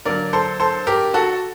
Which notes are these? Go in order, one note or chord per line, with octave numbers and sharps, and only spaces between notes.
D3 F#3 A#3 A#4 D5
A4 C5
A4 C5
G4 A#4
F#4 A4